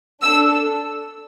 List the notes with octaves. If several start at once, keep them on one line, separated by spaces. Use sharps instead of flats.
D4 A4 E6